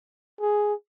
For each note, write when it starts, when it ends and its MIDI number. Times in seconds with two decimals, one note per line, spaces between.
0.41 0.74 68